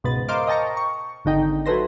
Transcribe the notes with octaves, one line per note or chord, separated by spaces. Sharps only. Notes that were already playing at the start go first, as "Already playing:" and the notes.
C#2 G#2 B2 B4 A6
A#4 C5 D#5 F5 D6
D#5 G5 A5 A#5 C#6
C#6
G#1 D3 D#4 G5
F#3 E4 A4 B4 C5 A#6